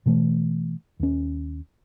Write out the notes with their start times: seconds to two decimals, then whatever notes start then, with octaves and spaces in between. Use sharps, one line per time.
0.06 B2 E3 A3
1.00 D#2 C#4